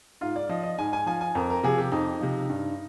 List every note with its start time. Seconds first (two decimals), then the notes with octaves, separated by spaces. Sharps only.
0.21 G#2 F4
0.36 D5
0.49 F3 D#5
0.64 D#5
0.78 G#2 G#5
0.93 G#5
1.06 F3 G#5
1.21 G#5
1.35 F2 A#4
1.50 A#4
1.63 C3 F3 G#4
1.78 G4
1.92 F2 D#4
2.21 C3 F3
2.50 G2